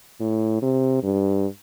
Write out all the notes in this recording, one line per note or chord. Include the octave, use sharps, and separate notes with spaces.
A2
C3
G2